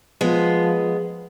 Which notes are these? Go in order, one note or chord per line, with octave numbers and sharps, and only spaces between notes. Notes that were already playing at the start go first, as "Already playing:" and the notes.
F3 G#3 B3